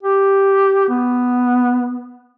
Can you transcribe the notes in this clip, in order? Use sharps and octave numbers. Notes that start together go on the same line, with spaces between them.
G4
B3